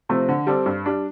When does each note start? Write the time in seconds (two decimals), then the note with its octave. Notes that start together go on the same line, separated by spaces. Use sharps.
0.09 C3 F3 A3 C4
0.29 D3
0.47 G3 C4 A4 D5
0.66 G2
0.86 G3 D4